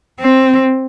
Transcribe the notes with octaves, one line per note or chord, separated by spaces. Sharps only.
C4